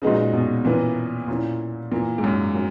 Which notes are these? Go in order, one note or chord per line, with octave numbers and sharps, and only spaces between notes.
A#2 C#3 G#3 D#4 F#4 B4
B2
A#2 E3 A#3 C#4 E4 B4
A#2 A#3 C#4 E4
A#2 E3 A#3 E4 A#4
G#2
F#2
F#3 A#3